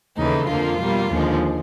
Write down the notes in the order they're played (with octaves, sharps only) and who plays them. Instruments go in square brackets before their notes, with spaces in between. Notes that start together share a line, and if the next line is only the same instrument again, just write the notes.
[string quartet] D#2 C#3 E3 A3 D#4
F2 D3 F3 A#3 F4
B2 G3 A#3
D#2 D3 F3 G#3